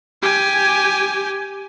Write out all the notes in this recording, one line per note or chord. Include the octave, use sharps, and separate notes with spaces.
G4 G#5